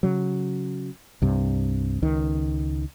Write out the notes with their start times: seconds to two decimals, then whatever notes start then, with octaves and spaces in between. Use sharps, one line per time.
0.03 C#3 F#3
1.22 C2 G2 C3
2.02 C#2 D#3